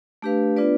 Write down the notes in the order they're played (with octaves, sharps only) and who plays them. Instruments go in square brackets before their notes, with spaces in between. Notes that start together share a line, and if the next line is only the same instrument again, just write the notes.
[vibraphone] A3 D4 G4 B4 F5
B3 D4 F4 B4 D5